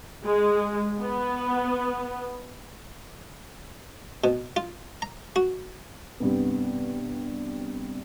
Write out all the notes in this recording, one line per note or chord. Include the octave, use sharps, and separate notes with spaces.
G#3
B3
B2
F4
A#5
F#4
G2 C3 B3